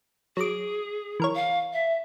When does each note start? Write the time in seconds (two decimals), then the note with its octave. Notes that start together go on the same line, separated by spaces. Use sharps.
0.37 F#3 G#4 D6
1.20 E3 A#4 C#5
1.35 F5
1.73 E5